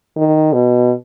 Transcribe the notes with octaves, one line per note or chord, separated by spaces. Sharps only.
D#3
B2